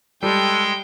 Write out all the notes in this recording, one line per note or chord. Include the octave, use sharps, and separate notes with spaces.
G3 G#3 A4 G5